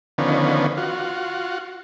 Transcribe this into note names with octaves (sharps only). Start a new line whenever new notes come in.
D3 D#3 F3 B3 C#4
F4 F#4